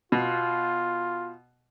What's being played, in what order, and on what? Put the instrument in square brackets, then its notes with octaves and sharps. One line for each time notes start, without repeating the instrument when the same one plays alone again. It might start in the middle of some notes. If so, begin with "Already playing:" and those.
[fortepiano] B2 [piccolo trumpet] F4